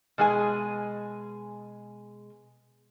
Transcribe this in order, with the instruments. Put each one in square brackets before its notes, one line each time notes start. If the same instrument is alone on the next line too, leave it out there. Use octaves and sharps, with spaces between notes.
[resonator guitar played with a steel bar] B2 G#3 G#4 G#5